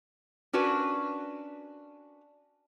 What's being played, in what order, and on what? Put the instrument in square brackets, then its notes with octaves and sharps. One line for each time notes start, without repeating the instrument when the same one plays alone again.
[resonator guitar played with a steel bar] C#4 D4 F#4 A#4 B4